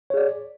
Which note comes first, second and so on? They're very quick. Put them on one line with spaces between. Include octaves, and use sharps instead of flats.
C#5 G#4 D5